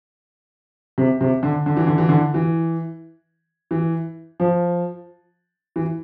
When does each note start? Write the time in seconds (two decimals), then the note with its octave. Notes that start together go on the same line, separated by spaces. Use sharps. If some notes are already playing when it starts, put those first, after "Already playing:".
0.98 C3
1.21 C3
1.43 D3
1.66 D3
1.77 E3
1.87 D3
1.98 E3
2.09 D3
2.34 E3
3.71 E3
4.40 F3
5.76 E3